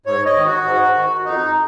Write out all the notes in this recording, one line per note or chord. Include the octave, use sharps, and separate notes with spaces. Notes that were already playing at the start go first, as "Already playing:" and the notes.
G#2 C#5
D#5
D#3
F#4
G#2
D#3
F2 D#4